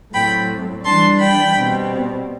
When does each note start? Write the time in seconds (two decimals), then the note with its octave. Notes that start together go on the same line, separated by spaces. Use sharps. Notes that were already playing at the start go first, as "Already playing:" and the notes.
0.14 A2 F#3 C4 G5 B5
0.85 E3 G3 D4 A5 C6
1.20 G5 B5
1.55 B2 G3 C4